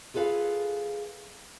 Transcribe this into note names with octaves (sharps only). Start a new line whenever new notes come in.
F4 G#4 A4 B4 F5